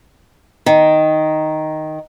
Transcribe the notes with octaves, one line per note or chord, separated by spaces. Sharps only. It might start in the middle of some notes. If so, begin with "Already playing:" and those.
D#3